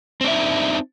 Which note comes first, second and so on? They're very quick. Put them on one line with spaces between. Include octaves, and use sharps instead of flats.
C4 D4 E5 D#4